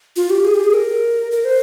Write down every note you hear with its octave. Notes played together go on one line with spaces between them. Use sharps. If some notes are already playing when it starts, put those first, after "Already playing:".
F4
G4
G#4
G4
G#4
A#4
A#4
C5